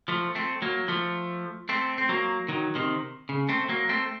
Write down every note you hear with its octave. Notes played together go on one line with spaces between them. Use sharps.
F3 A3
A3 C4
F#3 A#3
F3 A3
A3 C4
C4
F#3 A#3
D#3 F#3
C3 D#3
C#3
A3 C4
F#3 A#3
A3 C4